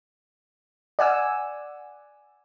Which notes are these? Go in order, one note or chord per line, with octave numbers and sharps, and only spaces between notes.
D5 F#5 G#5 E6